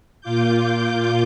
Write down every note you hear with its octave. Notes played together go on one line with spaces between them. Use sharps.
A#2 F4 D6 G6